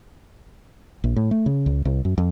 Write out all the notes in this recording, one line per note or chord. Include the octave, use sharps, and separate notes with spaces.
A#1
A2
A3
C#3
C#2
C2
F#2
F2